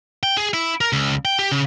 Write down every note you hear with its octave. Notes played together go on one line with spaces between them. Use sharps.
G5
G#4
E4
A#4
C#2
G5
G4
C#3